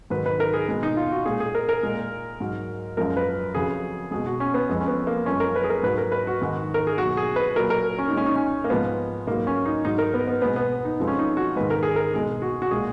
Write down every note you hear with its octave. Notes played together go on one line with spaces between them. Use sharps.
G#2 D#3 F#3 B4
B4
A#4
G#4
B2 G#3
D#4
F4
F#4
A#2 G#3 G#4
G#4
A#4
A#4
A#2 G#3
G#2 F#3
F#2 F3 G#3 A#4
B4
F2 C#3 F#3 G#4
B2 G#3 G#4
F#4
C#4
B3
F2 F3 G#3
C#4
B3
A#3
F#2 F3 G#3 C#4
A#4
B4
G#4
A#4
G#2 F#3 B4
A#4
B4
F#4
G#2 D#3 G#3
A#4
G#4
B2 F#3 F#4
G#4
B4
A#2 F#3 A#4
A#4
C#4
D#4
A#2 G#3 C#4
D#4
C#4
A#3
G#2 F3 G#3 B3
G#2 F#3 A#3
C#4
D#4
G#2 F#3 D#4
A#4
B3
B3
B2 G#3 B3
B3
D#4
F2 F3 G#3
C#4
D#4
F#4
G#2 D#3 G#3 B4
A#4
G#4
A#4
B2 G#3 G#4
F#4
F#4
A#2 G#3 G#4